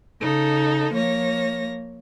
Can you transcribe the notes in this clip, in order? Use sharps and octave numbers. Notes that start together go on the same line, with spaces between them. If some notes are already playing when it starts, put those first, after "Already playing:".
C#3 D#4 A4
F3 A#3 C#5 A#6